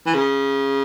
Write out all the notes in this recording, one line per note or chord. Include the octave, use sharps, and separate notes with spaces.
E3
C#3